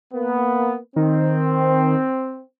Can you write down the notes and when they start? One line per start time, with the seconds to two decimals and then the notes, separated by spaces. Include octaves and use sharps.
0.13 A#3 B3
0.96 D#3 C4